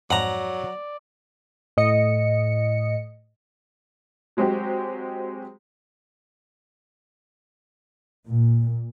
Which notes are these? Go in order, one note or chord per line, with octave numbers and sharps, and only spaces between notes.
F2 G#2 F#3 D5 F#5 A#5
A2 D#5 C#7
F#3 G#3 C4 F#4 G4
A#2